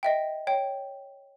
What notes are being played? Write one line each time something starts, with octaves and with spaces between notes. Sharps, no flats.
D#5 E5 G5
C#5 G5